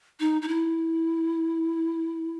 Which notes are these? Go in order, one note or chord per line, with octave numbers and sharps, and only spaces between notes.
D#4
D#4
E4